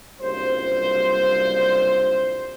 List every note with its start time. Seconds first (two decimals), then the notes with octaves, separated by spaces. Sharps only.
0.21 F#1 C2 G2 F4 C5